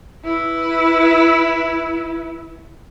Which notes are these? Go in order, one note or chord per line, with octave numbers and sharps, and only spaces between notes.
E4 B4